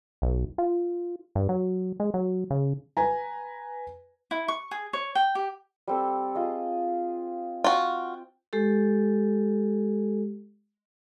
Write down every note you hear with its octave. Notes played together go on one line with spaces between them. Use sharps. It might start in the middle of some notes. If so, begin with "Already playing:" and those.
B1
F4
G2
F#3
G#3
F#3
C#3
B4 G#5 A#5
E4
C#6
G#4
C#5
G5
G4
G3 C4 A4
F4 G#4 D#5
F4 F#4 G5
G#3 G4 A4